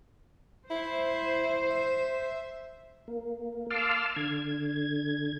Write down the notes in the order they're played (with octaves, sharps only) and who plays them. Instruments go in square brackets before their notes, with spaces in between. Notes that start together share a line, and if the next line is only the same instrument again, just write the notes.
[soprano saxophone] E4 [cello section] C5
[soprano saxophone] E5
[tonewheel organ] A#3
F5 A5 C6 D6 E6 F6
D3 G#6